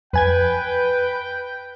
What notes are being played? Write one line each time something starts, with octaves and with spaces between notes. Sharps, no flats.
F2 B4 G5 G#5 G#6